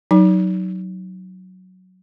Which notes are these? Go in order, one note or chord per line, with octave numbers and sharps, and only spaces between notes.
F#3 D#4